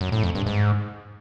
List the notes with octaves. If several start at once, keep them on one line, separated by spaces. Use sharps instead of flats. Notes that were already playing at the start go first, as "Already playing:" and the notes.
F#2
A2
F2
G2
G#2